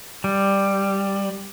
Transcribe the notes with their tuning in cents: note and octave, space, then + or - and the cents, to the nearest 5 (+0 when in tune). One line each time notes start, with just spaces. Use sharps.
G3 +5